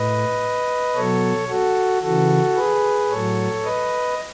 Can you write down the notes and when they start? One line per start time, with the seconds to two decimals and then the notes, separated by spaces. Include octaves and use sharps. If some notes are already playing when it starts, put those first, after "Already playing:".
Already playing: A2 B4 D#5
0.95 B2 F#3 A4 C#5
1.49 F#4 A4
2.02 C#3 E3 F#4 A4
2.56 G#4 B4
3.11 A2 F#3 A4 C#5
3.64 B4 D#5